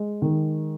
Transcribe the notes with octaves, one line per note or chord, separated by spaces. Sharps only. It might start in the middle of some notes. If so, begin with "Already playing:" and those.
Already playing: G#3
D#3